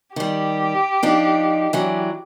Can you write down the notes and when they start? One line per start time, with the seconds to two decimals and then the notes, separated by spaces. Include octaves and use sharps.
0.16 D#3 G3 G4
1.03 F3 D4 D#4
1.73 E3 F#3 D4